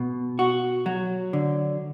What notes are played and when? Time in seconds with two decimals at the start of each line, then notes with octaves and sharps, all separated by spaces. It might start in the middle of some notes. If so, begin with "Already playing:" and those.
Already playing: B2
0.39 F#4
0.86 F#3
1.33 D3